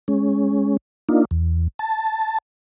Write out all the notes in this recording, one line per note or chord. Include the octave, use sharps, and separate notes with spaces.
G#3 C#4
A#3 D4 D#4 F4
E2
A5